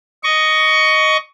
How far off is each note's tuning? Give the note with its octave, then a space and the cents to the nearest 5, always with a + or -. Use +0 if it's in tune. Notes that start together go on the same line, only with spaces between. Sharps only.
D#5 +0 C#6 +15